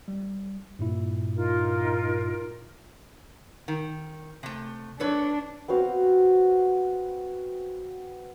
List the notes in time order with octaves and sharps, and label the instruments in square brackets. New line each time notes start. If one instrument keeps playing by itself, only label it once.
[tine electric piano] G3
G2 A#2 E4
[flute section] D#4 F4 A#4
[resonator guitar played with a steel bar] D#3
C3 A3
[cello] D4 [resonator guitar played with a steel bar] A4 B4 C#5
[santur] B3 C4 F#4 F5